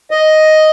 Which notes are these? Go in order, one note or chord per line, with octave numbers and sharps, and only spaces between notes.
D#5